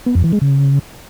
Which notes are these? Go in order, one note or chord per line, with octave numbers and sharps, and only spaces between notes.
B3
F2
E3
G#3
C#3